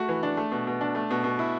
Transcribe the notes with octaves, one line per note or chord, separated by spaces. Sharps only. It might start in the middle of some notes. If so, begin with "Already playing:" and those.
Already playing: A3 F#4
E3
D4
A3
B2
B2
D4
A3
B2
B2
E4